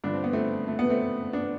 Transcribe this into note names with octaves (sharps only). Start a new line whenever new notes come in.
G2 D3 F3 D4
C4
B3
A3 C4
A3
B3
A3 C4
B3 D4